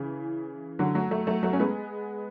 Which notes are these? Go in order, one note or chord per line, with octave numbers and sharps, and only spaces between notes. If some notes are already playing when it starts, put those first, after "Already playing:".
Already playing: C#3 E3
D3 F#3
F#3 A3
F#3 A3
F#3 A3
F#3 A3
C#4
G#3 B3